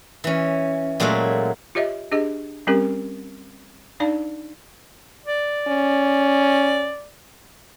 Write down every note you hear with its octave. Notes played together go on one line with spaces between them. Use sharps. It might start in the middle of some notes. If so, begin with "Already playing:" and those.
E3 C#4
A#2 F#3 G#3 A3 F4 F#4
F4 G4 C#5 D#5 E5
D4 G4 G#4 D#5
G3 C4 C#4 G4 A#4
D4 D#4 D5 F5 A5
D5
C#4